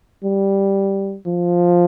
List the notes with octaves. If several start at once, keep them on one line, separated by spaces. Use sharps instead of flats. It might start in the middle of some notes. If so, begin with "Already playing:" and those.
G3
F3